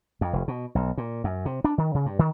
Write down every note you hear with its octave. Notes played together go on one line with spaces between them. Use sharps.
F2
F1
B2
B1
A#2
F#2
C3
D4
D#3
C#3
G2
D#3